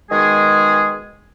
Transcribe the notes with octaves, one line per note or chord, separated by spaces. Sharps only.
B2 D#3 G#3 G#4